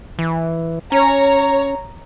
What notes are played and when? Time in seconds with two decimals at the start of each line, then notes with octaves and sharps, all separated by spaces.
0.19 E3
0.92 C#4 C#5 A#5